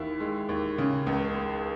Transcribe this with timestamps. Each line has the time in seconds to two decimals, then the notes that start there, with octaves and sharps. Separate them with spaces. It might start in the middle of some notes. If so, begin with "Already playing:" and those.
Already playing: D#2 D#3 E4
0.20 G#3
0.49 D#2
0.78 C#3
1.07 C#2
1.36 G#3